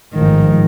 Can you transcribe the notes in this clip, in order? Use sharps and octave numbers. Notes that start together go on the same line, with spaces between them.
A1 G#2 D#3 F3